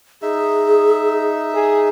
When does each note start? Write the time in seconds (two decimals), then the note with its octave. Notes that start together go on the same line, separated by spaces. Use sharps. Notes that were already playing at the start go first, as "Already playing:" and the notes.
0.22 D#4 G#4 E5
1.54 G#4